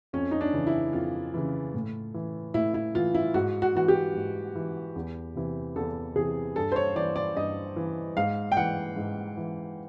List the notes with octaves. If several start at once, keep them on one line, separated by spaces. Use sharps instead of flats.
F2 C#4
D#4
D4
C#3 E3
E4
F2 F4
C#3 E3
A2
E3
A2 E4
E4
E3 F4
E4
G#2 F#4
F#4
E3 F#4
G4
G#2
E3
E2
C3 E3
E2 A4
C3 E3 G#4
G2 A4
C5
C#5
E3 D5
D5
G2 D#5
E3
G#2 F5
G5
E3 F#5
G#2
E3